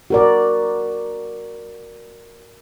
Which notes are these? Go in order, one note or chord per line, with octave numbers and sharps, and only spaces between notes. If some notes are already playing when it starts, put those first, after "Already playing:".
F#4 A#4 D5